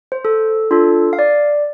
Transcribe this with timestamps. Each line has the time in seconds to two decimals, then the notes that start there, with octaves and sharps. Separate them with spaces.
0.12 C5
0.25 A4
0.71 D4 F4 A4
1.13 F5
1.19 D5